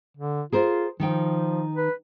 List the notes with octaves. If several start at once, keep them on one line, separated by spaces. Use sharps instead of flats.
D3
F4 G#4 A#4 C5
D#3 F3 D#4 G5
B4